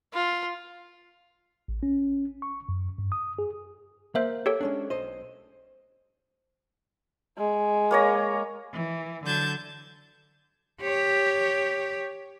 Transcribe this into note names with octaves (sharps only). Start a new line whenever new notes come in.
F4
A1
C#4
C#6
F#2
G2
D#6
G#4
A#3 C5 E5 F5
G4 A4 C#5
G#3 C#4 D4
B1 C5 D#5
G#3
A#3 C#5 A#5
E3
D3 F#3 A5 G6 G#6
G4 C#5